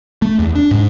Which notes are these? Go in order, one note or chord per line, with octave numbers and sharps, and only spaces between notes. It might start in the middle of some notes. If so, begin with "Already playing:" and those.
A3
E2
D4
G#2